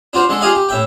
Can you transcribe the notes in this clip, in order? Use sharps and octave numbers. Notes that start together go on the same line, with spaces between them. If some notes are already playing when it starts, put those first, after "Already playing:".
D4 F4 F#4 C5
D3 G#3 A4
F4 G4 G#4 D#5 F5 G#5
G4
A2 E5 G5